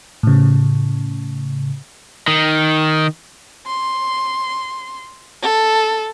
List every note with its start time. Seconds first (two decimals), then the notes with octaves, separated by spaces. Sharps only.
0.23 A2 C#3
2.28 D#3
3.67 C6
5.42 A4